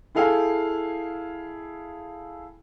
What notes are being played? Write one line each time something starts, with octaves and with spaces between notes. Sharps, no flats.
E4 G#4 A4 F5 G5 G#5